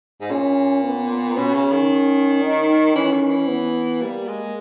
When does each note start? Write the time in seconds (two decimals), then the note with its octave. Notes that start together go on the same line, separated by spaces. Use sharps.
0.21 G#2
0.31 A#2 C#4
0.84 B3
1.37 B2 C#4
1.54 C#3
1.72 D#3
2.43 D#4
2.95 E3 C#4
3.13 D#3
3.31 E3
3.48 B3
4.01 G3 A#3
4.28 G#3